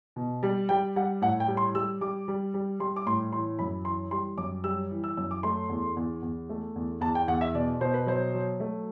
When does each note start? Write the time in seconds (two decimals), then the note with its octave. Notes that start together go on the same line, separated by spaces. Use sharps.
0.16 B2
0.43 G3
0.69 G3 G5
0.96 G3 F#5
1.22 A2 F#5
1.40 G5
1.48 G3
1.57 C6
1.75 G3 E6
2.01 G3 D6
2.28 G3
2.54 G3
2.80 G3 C6
2.96 D6
3.06 A2 C6
3.33 E3 C6
3.59 F#2 B5
3.85 E3 C6
4.11 G3 C6
4.38 F#2 D6
4.64 G3 E6
4.91 E3
5.04 E6
5.17 F#2 E6
5.31 D6
5.43 A3 C6
5.69 E2
5.96 E2
6.22 E2
6.49 A3
6.76 E2
7.01 E2 A5
7.15 G5
7.28 E2 F#5
7.41 E5
7.54 B2 D5
7.80 B2 C5
7.94 B4
8.06 F#3 C5
8.34 F#3
8.60 A3